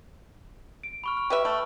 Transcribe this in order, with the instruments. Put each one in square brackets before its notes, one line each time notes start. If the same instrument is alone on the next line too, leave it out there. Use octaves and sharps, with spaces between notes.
[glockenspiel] D7
B5 C#6 F6
F6
[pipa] G4 B4 E5
A3